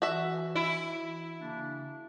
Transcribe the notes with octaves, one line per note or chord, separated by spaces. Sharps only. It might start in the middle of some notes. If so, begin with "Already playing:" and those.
E3 F#4 E5
E4
C#3 A#3 D4